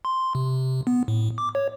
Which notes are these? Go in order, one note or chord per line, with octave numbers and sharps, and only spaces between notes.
C6
C3
B3
A2
D6
C#5